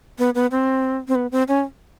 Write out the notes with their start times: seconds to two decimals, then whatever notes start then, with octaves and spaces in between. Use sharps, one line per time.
0.19 B3
0.35 B3
0.51 C4
1.08 C4
1.15 B3
1.32 C4
1.48 C#4